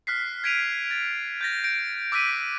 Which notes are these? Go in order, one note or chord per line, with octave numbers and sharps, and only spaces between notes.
F6 F#6 B6 C7
G#6 B6 D7 D#7 F7
A6
G6 A6 A#6
G6 A#6 D7
D6 E6 F#6 B6 D#7